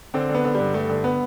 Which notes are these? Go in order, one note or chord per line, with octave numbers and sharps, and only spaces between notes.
D3 C4
D3
B3
D3
G2 G3
G2 A3
D3
B3